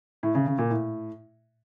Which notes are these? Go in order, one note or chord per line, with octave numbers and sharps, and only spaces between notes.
A2
C#3
C#3
A#2
A2